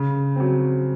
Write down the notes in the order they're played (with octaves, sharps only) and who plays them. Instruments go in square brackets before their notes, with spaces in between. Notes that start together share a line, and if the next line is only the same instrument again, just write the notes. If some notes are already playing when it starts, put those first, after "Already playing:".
Already playing: [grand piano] C#3
F#3 C4